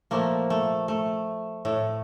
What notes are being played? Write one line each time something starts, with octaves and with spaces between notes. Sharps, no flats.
A#2 F3 A3 A#3
A3
A3
A2 A3